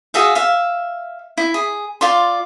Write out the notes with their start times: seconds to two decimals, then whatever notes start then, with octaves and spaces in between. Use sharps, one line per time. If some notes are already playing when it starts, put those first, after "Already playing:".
0.14 F#4 G#4 E5 F5
0.35 E5 F5
1.38 E4
1.54 G#4
2.01 F4 D5 C6